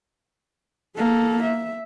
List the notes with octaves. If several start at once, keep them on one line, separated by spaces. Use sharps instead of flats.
A#3 A4
E5